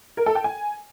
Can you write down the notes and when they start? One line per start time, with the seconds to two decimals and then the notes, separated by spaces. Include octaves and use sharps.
0.17 A#4
0.26 A4
0.35 G5
0.44 G#5